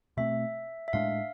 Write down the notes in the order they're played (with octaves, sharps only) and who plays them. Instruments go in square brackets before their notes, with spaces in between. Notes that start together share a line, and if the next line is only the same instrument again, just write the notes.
[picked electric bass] B2 A3 C4 [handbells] E5
[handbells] E5
[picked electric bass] A2 G#3 D4 [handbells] F5